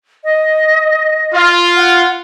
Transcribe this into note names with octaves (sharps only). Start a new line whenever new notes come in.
D#5
F4
F#5